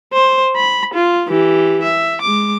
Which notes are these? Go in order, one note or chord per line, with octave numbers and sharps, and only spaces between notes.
C5
B5
F4
E3 G4
E5
G#3 D6